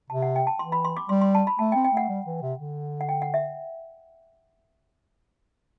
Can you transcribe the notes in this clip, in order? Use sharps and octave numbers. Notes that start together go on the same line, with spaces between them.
C3 A5
F#5
G5
A5
E3 C6
B5
C6
D6
G3 C6
C6
A5
B5
A3 A5
G5
C4
G5
A3 F#5
G3
E3
C3
D3
F#5
G5
F#5
E5